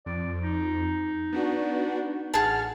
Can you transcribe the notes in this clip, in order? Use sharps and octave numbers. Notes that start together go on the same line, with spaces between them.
F2 D5
D#4
B3 D4 F#4
A1 G#4 F#5 A5 F6